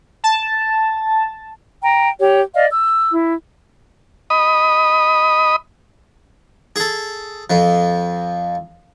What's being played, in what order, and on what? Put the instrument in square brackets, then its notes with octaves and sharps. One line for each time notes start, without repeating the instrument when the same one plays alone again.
[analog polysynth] A5
[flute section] G5 A#5
G4 C#5
D5 D#5 F5
E6
E4
[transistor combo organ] D#5 B5 D#6
[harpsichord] G#4 A4
F2 F3